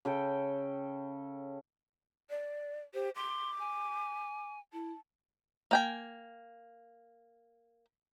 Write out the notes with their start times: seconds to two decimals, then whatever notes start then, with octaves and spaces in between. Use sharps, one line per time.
0.05 C#3 A4 G5
2.30 D5
2.94 G4 C5
3.16 C6 D6
3.59 G#5
4.73 E4 A5
5.71 A#3 G5 G#5